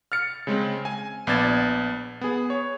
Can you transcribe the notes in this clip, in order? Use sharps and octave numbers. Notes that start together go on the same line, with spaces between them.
F6 A6 C#7
C#3 G#3 C4
G#5
A#1 B3 D5 G#6 A6 E7
B3 G#4
C#5